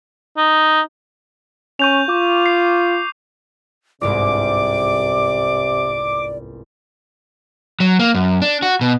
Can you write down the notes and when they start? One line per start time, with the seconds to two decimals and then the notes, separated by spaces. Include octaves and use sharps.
0.37 D#4
1.79 C#4 C#6 G6 F7
2.09 F4 D6
2.46 C7
4.01 G1 C2 G#2 C3 D5 D6
7.80 F#3
7.99 A#3
8.14 F#2
8.42 D4
8.62 F#4
8.81 B2